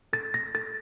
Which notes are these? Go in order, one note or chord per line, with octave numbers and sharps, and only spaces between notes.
A4 A6
A#6
A4 A6